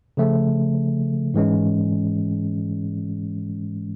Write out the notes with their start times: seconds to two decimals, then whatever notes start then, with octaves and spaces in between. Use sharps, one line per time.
0.17 C#3 F3 A3
1.34 G#2 E3 G#3 C#4